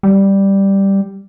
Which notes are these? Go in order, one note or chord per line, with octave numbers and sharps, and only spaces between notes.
G3